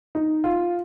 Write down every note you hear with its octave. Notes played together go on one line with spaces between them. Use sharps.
D#4
F4